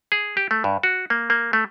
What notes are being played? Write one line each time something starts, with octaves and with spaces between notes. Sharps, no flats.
G#4
G4
A3
G2
F#4
A#3
A#3
A3